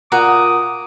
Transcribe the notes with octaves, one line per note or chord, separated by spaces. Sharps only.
A#2 F#4 A#5 D6 D#6